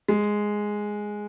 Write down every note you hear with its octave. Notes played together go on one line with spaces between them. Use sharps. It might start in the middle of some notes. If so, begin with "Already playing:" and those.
G#3